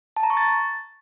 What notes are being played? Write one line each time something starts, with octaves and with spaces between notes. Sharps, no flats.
A5
A#5
C#6
A6